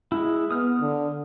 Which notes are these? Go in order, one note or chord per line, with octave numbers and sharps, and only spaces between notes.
G#3 E4
B3 D#6 F6
D3